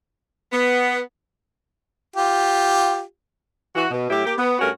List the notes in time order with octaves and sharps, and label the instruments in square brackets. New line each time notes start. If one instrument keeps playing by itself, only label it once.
[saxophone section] B3
[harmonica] F4 G4
[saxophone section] E3 F#4
B2
A2 F#3 E4 G4
A#3 G4
B3
G2 A3 C#4 F#4 A#4